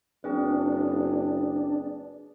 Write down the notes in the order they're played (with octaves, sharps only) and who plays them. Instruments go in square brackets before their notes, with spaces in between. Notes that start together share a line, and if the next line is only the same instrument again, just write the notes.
[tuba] F#1 [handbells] C4 G#4 B4 [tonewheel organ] D4